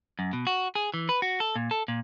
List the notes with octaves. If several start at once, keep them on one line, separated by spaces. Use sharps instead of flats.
F#2
B2
F#4
G#4
E3
B4
F#4
A4
A#2
A4
A#2